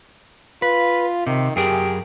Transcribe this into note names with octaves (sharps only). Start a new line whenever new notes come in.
F4 B4
C3 D#3
F#2 G4 G#4 A#4